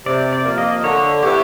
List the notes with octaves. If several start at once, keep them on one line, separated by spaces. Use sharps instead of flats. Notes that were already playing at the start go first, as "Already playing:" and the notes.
C3 D5
D5
F3 A#3
D#5
D3 C#5
G3 B3 E4 G4 C#5